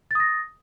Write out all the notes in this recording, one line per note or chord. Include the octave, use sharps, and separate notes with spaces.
D#6 A6 A#6